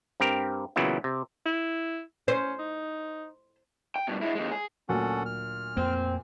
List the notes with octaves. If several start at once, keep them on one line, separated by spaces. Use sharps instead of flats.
G2 C4 G4 A#4
A#2 C#3 E3 F#3 B3 E4
C3
E4
C#4 C5
D#4
G5
G2 B2
G#3 E4
D#2 G#3
G#4
D2 A#2 F#3 C#4 A4 F#5
F6
F2 A#3 C4